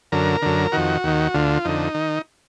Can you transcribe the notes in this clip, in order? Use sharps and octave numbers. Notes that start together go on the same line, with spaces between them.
F#2 D3 A#4
F#2 D3
F2 D#3 F#4
D#2 D#3
D2 D3 F4
F2 D3 D#4
D#3